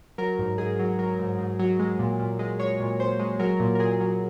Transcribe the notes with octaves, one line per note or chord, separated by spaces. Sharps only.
F#3 A#4
G#2
G#2 G#4
F#3
F#3 A#4
G#2
G#2
F#3
G#3
A#2
A#2
G#3
G#3 C#5
A#2
A#2 C5
G#3
F#3 A#4
A#2
A#4
A#2 G#4
F#3